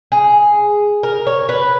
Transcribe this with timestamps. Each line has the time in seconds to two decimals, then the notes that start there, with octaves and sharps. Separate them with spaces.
0.12 G#4
1.03 A#4
1.27 C#5
1.49 B4